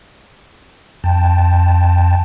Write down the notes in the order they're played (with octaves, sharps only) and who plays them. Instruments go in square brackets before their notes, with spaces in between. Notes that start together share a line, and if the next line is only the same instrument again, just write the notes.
[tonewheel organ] F2 G5 A5